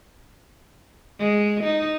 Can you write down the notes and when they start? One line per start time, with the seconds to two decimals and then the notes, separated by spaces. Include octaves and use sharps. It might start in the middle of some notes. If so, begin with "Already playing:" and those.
1.19 G#3
1.63 D#4